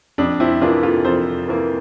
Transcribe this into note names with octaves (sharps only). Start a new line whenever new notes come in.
F2 D4
C4 E4
E3 A#3 D4 F4
F4 A4
F2 A4 C5
E3 A#3